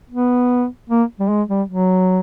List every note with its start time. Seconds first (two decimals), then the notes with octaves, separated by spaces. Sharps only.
0.10 B3
0.90 A#3
1.20 G3
1.29 G#3
1.49 G3
1.68 F#3